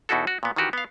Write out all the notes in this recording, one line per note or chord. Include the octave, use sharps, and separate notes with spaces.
E2 B2 D#4 E4 F#4 A4
F#4
A#2 B3
D#3 E3 F#4 G4
B3 F5